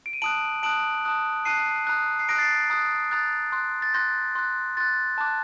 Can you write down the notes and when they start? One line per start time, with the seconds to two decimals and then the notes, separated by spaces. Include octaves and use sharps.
0.06 D7
0.13 D#7
0.22 A5 D#6 F#6 D7 F#7
0.63 A5 D#6 F#6 D7 F#7
1.05 A5 D#6 F#6
1.45 A5 D#6 F#6 C7 D#7
1.87 A#5 D#6 F#6
2.19 C7
2.29 A#5 D#6 F#6 A#6 D7
2.38 A6 C7
2.70 A#5 D#6 F#6
3.11 A#5 D#6 F#6 A6
3.52 C6 F#6
3.82 A6
3.94 C6 F#6 G6 A#6
4.35 C6 F#6
4.77 C6 F#6 A6
5.18 A5 D6 F#6